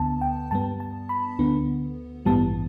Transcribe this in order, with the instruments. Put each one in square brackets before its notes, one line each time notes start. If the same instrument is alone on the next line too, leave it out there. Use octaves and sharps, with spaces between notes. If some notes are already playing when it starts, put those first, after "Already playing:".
Already playing: [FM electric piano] D2 D3 B3 A5
G5
G2 G3 B3 A5
A5
B5
D2 D3 B3
A1 G2 E3 G3 B3 A5